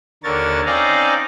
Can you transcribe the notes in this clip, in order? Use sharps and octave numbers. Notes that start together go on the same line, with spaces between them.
D#2 D3 A#4 C#5 A6
C4 C#4 D#4 D5 F5 A#5